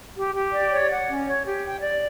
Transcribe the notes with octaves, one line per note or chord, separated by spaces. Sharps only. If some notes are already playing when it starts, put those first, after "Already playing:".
G4
G4
D5
C#5
F#5
C#4
C#5
G4
G5
D5